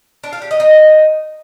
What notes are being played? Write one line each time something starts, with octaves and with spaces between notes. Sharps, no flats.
D4
F5
G4
D#5
D#4